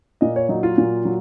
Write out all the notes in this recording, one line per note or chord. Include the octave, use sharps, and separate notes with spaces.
A#2 D#5
C#5
F#3 D#4
F4
A#2
F#3